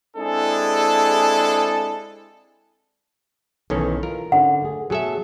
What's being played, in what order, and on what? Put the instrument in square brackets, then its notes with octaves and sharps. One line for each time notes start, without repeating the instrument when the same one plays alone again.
[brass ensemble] G#3 C4 D4 E4 G#4 A4
[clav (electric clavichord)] B1 D#3 C#4 [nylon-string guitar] E3 A4
[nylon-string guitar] F4 [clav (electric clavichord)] A#4
[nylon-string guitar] D3 C#4 D#4 [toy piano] F#5
[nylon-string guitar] A3 G#4
[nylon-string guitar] B2 A3 G#4 [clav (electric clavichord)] F#3 A4 E5